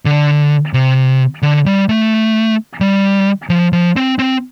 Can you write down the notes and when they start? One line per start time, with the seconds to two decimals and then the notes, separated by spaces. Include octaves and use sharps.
0.05 D3
0.73 C3
1.42 D3
1.66 G3
1.89 A3
2.81 G3
3.50 F3
3.73 F3
3.96 C4
4.19 C4